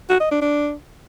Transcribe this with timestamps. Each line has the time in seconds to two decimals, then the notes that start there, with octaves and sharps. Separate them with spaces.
0.10 F#4
0.20 D#5
0.31 D4
0.42 D4